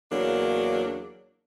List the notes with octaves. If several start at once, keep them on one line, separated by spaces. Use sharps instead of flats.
E2 C#3 F#3 A#3 D4